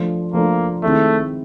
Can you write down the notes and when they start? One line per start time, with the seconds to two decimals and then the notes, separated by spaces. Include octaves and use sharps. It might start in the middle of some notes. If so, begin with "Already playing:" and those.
Already playing: F3 A3 D4
0.33 F3 A3 A#3 D4
0.83 D#3 G#3 A3 C4 E4